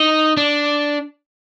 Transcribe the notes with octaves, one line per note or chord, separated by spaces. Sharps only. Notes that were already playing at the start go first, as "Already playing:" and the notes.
Already playing: D#4
D4